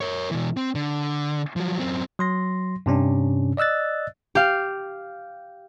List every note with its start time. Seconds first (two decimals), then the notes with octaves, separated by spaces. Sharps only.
0.01 A#4 C#5
0.31 B2 E3
0.57 C4
0.75 D3
1.56 F3 F#3
1.79 F#2 C4
2.19 F#3 C6 A#6
2.86 G2 C3 C#4 D4
3.57 D5 D#5 E6 F#6 A6
4.35 G4 F5